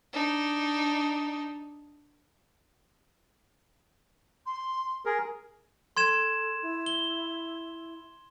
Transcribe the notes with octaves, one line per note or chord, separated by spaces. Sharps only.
D4 D#4
C6
G#4 A#4
A4 C6 G#6 E7
E4
G7